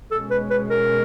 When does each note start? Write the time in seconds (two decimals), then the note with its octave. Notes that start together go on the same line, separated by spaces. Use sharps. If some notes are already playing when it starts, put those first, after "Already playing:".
0.11 B2 G#3 C#4 A4
0.31 B4
0.51 B4
0.70 A#4